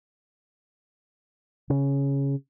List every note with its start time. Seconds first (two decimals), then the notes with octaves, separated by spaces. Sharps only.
1.70 C#3